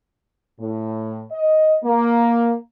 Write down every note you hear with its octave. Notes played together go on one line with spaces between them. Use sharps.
A2
D#5
A#3